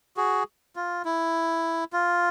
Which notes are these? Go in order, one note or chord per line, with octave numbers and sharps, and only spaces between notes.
F#4 G#4
F4
E4
F4